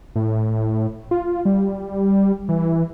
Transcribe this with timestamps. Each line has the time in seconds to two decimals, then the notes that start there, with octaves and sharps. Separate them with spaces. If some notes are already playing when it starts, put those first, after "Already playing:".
0.16 A2
1.11 F4
1.45 G3
2.49 E3